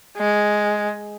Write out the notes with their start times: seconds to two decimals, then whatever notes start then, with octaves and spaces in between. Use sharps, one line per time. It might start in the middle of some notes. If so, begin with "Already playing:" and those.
0.18 G#3